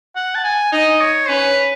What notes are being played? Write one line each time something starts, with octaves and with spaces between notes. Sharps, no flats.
F#5
A5
G#5
D#4 D#5
C#5
C#4 B4